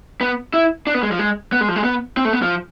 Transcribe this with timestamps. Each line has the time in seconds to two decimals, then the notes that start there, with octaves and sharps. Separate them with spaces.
0.21 B3
0.54 E4
0.87 D4
0.94 B3
1.03 G#3
1.12 F3
1.19 G#3
1.52 B3
1.61 G#3
1.68 F3
1.76 G#3
1.84 B3
2.17 C4
2.25 A3
2.33 B3
2.42 F3